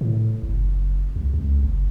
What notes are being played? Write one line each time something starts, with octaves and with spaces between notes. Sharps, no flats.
A2
F#1
C2
C#2
F#1